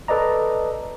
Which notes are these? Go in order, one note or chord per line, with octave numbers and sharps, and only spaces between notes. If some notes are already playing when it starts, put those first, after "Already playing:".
A4 B4 D5 D#5 A#5